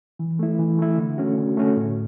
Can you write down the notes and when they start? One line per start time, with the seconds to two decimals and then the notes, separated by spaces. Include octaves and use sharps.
0.19 E3
0.39 A3 E4
0.59 E3
0.79 A3 E4
0.98 D3
1.18 A3 C#4 F#4
1.38 D3
1.57 A3 C#4 F#4
1.77 A2